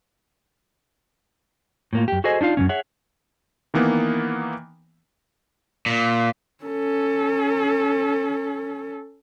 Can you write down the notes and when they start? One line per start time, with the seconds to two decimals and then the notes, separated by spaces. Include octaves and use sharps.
1.93 A2 A#3 F4
2.08 F#2 G4
2.24 F#4 G#4 A4 C5 D#5 G#5
2.41 D4 D#4 F4 F5
2.57 F#2 C3 C#4
2.69 G#4 C#5 E5 F#5
3.74 D#3 E3 A#3 B3
5.86 A#2
6.64 C#4 A4